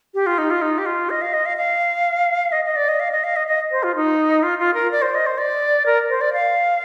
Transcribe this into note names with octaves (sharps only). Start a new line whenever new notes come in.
G4
F4
D#4
F4
D#4
G4
F4
D#5
F5
D#5
F5
F5
D#5
D#5
D5
D#5
F5
D#5
F5
D#5
D#5
C5
F4
D#4
F4
F4
A#4
D5
C5
D#5
C5
D5
A#4
C5
D5
F5